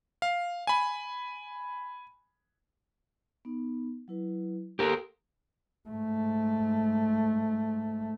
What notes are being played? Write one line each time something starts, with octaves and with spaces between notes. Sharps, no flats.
F5
G#5 B5
B3 D#4
F#3 E4 B4
A#3 G4 A4 A#4 C6
G#2 A3